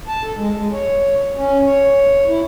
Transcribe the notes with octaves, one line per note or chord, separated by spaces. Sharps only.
A5
A4
G#3
G#3
C#5
C#4
C#5
E4